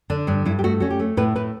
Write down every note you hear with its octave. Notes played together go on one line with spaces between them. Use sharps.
D3 D4
G2 D4
G2 E4
G4
A3 F#4
C#4 F#4
G4
A3
A2 B4
A2 B4